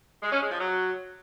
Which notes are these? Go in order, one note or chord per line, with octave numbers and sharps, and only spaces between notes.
G#3
C#4
G#3
F3
F#3